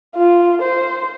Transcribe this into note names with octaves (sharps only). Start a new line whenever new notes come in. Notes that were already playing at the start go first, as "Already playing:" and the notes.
F4
C5